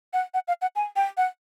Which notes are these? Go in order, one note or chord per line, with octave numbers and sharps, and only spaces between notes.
F#5
F#5
F5
F#5
G#5
G5
F#5